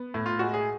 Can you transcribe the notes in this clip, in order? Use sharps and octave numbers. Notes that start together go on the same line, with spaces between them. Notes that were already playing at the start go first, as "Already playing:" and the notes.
Already playing: B3
A2
F4
G#3 F#4
G#4